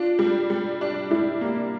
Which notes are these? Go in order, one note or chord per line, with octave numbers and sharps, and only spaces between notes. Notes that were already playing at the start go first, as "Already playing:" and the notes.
Already playing: D4 F4
G3
G3
D4
G3 E4
A#3